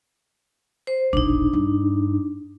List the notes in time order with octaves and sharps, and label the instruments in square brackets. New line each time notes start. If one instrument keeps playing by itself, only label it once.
[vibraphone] C5
[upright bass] E1 A#1 [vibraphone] D4 D#4
[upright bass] G2